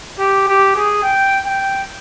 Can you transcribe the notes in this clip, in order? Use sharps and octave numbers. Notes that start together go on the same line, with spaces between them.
G4
G4
G#4
G5
G5